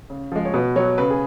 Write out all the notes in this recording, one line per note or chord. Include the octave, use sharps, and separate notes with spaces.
C#3
F3 G#3
C#5
B2 B4
F#3 C#5
C#3 B4
G#4